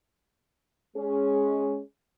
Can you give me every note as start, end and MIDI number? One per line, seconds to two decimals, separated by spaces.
0.97 1.79 56
0.97 1.79 61
0.97 1.79 68